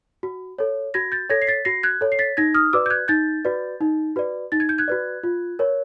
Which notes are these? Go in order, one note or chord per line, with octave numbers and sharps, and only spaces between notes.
F#4
A4 C#5
F#4 G#6 A#6
G6 A6
A4 C#5 G#6 A#6
C7
A6 B6
F#4 A#6 C7
F#6 G#6
A4 C#5
C7
A6 B6
D#4 G#6 A#6
D#6 F6
F#4 B4 D5 D6 E6
G6
F#6 G#6
D#4 G6 A6
F#4 B4 D5
D#4
F#4 B4 D5
D#4 A6
G#6
G6
F#6 G#6
F#4 B4 D5
F4
A#4 C#5